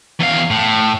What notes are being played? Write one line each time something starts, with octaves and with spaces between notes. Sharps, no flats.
E2 F5
A2